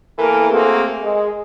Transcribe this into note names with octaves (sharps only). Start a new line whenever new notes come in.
E2 E3 A#3 A4 A#4
A3 A#3 C4 F#4 G#4 A4
G#3